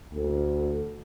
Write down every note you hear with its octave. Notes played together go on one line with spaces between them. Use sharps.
D2